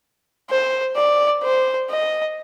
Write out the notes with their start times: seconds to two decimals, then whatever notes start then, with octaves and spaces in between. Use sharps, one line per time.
0.50 C5
0.96 D5
1.43 C5
1.90 D#5